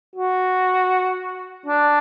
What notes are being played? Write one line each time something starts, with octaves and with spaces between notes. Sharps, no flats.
F#4
D4